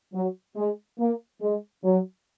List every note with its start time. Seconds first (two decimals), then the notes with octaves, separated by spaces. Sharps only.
0.14 F#3
0.56 G#3
0.99 A#3
1.41 G#3
1.84 F#3